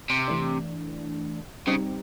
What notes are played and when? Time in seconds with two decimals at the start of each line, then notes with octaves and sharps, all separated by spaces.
0.10 C3
0.28 E3 A3 D4
1.67 C#3 G3 C4 D#4 G4